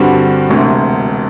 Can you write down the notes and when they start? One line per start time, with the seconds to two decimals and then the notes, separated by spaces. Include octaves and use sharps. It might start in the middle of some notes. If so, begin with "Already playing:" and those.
Already playing: G2 D3 G3 C4 F#4
0.49 E1 D2 C3